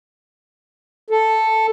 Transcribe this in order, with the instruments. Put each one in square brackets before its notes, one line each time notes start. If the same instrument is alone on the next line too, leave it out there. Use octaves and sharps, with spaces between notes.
[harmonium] A4